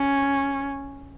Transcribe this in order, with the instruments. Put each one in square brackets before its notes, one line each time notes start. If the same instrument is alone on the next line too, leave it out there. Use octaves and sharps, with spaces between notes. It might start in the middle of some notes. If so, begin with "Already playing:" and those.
Already playing: [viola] C#4